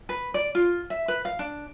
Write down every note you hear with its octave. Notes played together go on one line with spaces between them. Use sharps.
B4
D5
F4
E5
B4
F5
D4